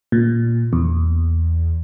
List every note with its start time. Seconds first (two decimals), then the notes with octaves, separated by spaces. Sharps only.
0.12 A#2
0.73 E2